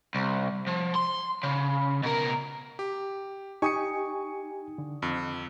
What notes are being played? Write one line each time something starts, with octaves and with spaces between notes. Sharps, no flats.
C2
F3
C6
C#3
B2 A#4
G4
D#4 G4 G#5 C#6 D#6 C#7
D3
F2